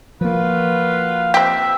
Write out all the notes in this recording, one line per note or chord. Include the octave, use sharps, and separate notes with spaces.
F3 A#3 F4 F#4 B4 F5
C4 G4 E5